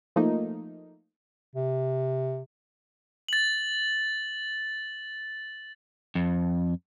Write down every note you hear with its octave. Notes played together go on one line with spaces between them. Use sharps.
F3 A3 A#3 D#4
C3
A6 F#7
F2